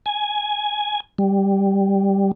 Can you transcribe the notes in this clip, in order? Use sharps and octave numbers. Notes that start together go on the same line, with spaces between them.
G#5
G3